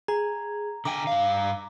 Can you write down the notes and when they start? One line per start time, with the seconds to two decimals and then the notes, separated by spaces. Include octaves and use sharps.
0.08 G#4 A#5
0.85 D3 G5 G#5 A#5 D6
1.07 G2 F5